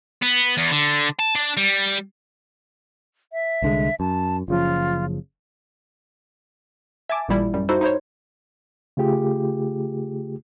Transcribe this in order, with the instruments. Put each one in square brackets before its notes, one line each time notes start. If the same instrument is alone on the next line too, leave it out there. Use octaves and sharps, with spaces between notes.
[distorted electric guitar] B3
E2
D3
A5
D4
G3
[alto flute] E5
[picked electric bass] C2 D3 G#3
[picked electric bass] F#2 [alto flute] A5
[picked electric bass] F#1 C#3 F3 [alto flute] F4
[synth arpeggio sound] E5 G#5 A5 D6
A1 A#2 G3 E4
F#2 G3
D#4 E4 F#4 A4 C5
D#4 E4 C5 C#5
[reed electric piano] C#3 A3 F4 G4 G#4